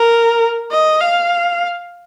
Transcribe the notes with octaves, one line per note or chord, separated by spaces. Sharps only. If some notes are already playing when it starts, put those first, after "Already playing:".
Already playing: A#4
D#5
F5